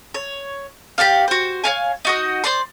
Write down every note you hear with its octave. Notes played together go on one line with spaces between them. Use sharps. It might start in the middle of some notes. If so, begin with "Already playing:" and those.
C#5
G4 A4 D5 F5
F#4 C5
C#5 F5 G#5
D#4 F#4 D#5
C5 D5 C6